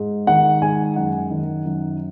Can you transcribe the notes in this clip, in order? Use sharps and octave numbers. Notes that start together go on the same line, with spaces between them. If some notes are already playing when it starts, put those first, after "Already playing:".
Already playing: G#2
D#3 F#5
G#2 G#5
F#2 F#5
D#3
F#2